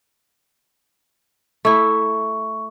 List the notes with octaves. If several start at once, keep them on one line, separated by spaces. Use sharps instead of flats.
A3 E4 C#6